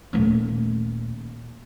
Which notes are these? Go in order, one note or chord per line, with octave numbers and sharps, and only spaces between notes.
D#1 A3